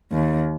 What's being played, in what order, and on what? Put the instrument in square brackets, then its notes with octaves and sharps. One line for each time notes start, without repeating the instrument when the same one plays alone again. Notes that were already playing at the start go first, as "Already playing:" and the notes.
[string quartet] D#2